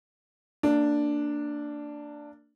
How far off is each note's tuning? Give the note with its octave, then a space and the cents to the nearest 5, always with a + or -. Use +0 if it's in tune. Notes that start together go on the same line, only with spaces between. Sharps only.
A#3 -30 D4 +0